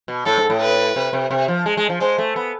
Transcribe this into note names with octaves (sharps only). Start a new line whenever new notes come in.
B2
A2 A4
G#2
A2
B4
C3
C3
C3
F3
G#3
G#3
F3
G#3 C5
A3
B3